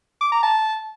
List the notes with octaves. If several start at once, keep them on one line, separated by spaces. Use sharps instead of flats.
D6
A#5
A5